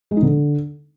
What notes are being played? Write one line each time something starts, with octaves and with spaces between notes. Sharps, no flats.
G#3
D#4
D3